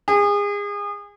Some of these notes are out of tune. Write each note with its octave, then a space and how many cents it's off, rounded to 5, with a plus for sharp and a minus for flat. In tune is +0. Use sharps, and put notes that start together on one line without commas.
G#4 -30